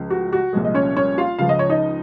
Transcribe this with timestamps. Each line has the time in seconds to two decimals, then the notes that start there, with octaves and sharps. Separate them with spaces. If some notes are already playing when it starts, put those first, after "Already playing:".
Already playing: C#2 C#3 F3
0.10 F#4
0.33 F#4
0.53 C2 A#2 F3 G#3
0.65 D#5
0.74 C#4 C#5
0.97 C#4 C#5
1.18 F4 F5
1.39 C#2 C#3 F3 F5
1.49 D#5
1.59 C#5
1.69 D#4 D#5